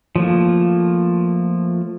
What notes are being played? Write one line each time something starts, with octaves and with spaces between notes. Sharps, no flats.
F3 A3 A#3